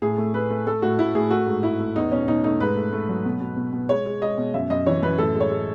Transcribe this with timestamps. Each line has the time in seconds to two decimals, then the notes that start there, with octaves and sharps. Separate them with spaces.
0.02 A2 G#4
0.18 A3
0.34 A3 B4
0.51 A3
0.67 A3 A4
0.82 A2 F#4
0.99 A2 E4
1.15 A2 G#4
1.30 A3 F#4
1.47 G#2
1.63 G#2 E4
1.80 A3
1.96 E2 D#4
2.12 B2 C#4
2.28 B2 D#4
2.44 A3 D#4
2.60 G#2 B4
2.76 A3
2.93 A3
3.09 F#3
3.25 B2
3.40 B2
3.57 B2
3.73 B2
3.89 G#3 C#5
4.06 G#3
4.22 G#3 D#5
4.38 B2
4.54 F#2 E5
4.70 F#2 D#5
4.86 E3 C#5
5.03 F#2 B4
5.18 A2 A4
5.35 G#3
5.40 C#5
5.51 G#3